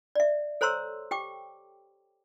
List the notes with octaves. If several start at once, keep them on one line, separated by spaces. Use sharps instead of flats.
D5 E5
A4 C5 C#5 A#5 C6 E6
G4 G5 D6